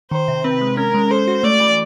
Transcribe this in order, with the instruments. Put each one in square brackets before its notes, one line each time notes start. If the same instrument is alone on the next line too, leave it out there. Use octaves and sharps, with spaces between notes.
[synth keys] D#3 [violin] C5
[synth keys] C3
[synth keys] C4 [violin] B4
[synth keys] G#3
[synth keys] C#4 [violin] A#4
[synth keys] G#3
[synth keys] A4 [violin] C5
[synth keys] F#4
[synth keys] A3 [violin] D5
[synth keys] E3